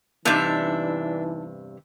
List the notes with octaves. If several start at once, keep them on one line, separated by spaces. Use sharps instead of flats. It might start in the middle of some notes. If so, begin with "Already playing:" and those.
E2 G2 C3 E3 D4 D#4 E5 A5